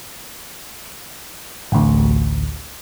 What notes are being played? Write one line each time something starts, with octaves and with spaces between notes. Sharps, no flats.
A1 D2